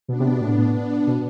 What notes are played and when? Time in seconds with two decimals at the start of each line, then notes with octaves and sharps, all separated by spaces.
0.08 B2 B3 D4
0.20 C3
0.30 B2
0.41 A2
0.74 B3 D4
1.07 B2